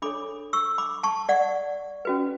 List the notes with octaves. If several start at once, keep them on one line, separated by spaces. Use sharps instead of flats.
D4 A4 C#5 B5 D6
C#6 E6
B5 D6
A5 C#6
D5 F#5
C#4 F#4 B4